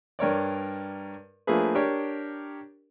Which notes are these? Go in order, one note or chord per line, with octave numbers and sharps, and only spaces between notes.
G2 A#4 C#5 D5
F3 A3 A#3 D4 G#4 B4
D4 G4 A#4 C#5